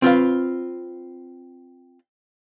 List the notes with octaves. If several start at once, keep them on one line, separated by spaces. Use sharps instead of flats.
C4 F4 B4 F5